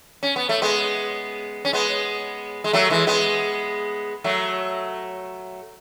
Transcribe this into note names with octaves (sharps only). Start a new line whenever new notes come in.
C#4
B3
A3
G#3 B3
C#4
G#3 B3
G#3
F#3 A3
E3 G#3
G#3 B3
F#3 A3